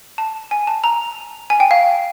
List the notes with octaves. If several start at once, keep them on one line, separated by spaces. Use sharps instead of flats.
A5
G#5
A5
A#5
G#5
G5
F5